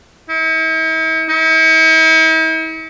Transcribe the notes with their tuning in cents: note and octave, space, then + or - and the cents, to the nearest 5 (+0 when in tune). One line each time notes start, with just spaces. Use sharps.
E4 -45
E4 -45